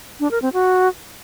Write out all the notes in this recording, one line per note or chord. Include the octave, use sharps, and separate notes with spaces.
D4
A#4
C4
F#4